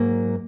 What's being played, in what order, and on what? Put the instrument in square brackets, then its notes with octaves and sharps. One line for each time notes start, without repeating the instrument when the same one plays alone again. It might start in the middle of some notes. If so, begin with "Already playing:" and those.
Already playing: [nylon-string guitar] G#2 F#3 A#3